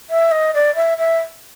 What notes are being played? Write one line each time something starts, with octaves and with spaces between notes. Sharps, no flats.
E5
D#5
D5
E5
E5